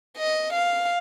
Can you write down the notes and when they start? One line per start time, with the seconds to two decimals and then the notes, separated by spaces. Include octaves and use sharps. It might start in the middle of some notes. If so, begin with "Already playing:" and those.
0.17 D#5
0.53 F5